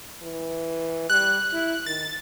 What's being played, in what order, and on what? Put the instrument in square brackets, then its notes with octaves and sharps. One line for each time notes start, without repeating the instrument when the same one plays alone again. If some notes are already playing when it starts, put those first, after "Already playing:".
[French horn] E3
[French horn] G3 [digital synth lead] F#6
[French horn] E4
[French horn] D#3 [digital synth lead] A6